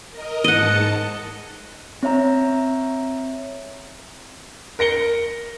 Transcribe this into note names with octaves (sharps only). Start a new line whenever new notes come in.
A#4 D#5
G#2 D#5 F#5 A5 C#7
C4 C#5 E5 A#5
A#4 A#6 C#7 G7